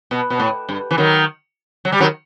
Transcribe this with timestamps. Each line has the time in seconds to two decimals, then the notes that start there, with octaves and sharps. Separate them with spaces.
0.11 B2
0.30 B2
0.39 A2
0.69 G2
0.91 E3
0.98 D#3 F#3
1.85 F#3
1.92 G3
2.00 D#3 F#3